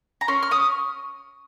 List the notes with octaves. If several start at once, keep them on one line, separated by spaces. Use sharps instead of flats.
A#5
C#4 C6
F6
C#4 D#6